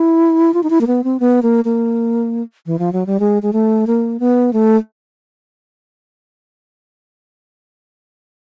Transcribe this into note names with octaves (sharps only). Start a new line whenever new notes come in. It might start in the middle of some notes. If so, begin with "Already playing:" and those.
Already playing: E4
F4
D#4
E4
A#3
B3
C4
B3
A#3
A#3
E3
F3
F#3
G3
G#3
G#3
A3
A#3
B3
A3